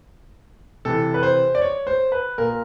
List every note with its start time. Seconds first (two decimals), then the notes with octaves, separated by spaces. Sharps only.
0.85 C3 E3 A4
1.14 B4
1.23 C5
1.55 D5
1.61 C#5
1.87 C5
2.12 B4
2.38 A#2 A#4